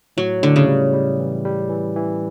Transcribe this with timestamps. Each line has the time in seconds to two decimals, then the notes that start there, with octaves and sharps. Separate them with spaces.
0.17 A2 F#3
0.43 A2 D3
0.56 C#3
0.67 G3
0.93 G3
1.19 E3
1.45 G3
1.70 E3
1.96 E3